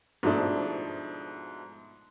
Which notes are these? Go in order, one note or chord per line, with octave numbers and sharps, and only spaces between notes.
G#2 B2 F3 A3 D4 E4